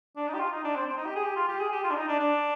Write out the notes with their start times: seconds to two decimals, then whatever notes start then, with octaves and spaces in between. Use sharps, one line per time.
0.16 D4
0.28 D#4
0.34 G4
0.39 F4
0.52 D#4
0.64 D4
0.76 C4
0.87 C4
0.97 D#4
1.05 G4
1.15 G#4
1.23 G4
1.36 F4
1.48 G4
1.60 G#4
1.72 G4
1.84 F4
1.90 D4
1.96 D#4
2.08 D4
2.19 D4